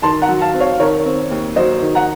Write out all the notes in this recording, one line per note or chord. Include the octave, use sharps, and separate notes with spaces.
D#3 A5 C6
F#5 A#5
F#3
F5 A5
C4
C#5 F5
D#3 A#4 C#5
C4
D#2
F#3 C5 D#5
D#3
F#5 A#5